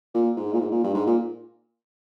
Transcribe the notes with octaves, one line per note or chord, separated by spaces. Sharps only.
A#2
G#2
A#2
G#2
A#2
G2
G#2
A#2